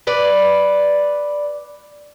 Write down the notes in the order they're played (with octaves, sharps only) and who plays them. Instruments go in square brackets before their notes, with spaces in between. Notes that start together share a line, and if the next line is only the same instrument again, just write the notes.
[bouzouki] B4 D5